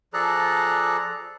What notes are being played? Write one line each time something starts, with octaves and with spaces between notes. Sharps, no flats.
F3 G#4 A4 D5 A#5 F#6